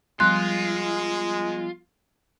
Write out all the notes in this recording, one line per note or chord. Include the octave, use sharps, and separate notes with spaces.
F3 G3 G#3 B3 F4 C6 F#6